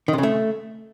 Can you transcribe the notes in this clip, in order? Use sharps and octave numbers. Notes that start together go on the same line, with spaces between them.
D#3
C3
C#3
A3